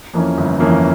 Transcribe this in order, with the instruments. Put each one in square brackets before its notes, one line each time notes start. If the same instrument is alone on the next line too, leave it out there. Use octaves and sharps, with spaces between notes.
[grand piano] F2 E3 A#3 C#4
G1
F2 E3 A#3 C#4